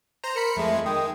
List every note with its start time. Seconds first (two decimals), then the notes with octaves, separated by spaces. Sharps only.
0.24 C5 A#5
0.36 A#4 B5 C#7
0.57 F2 G#3 A3
0.86 D#3 G#3 G5 D#6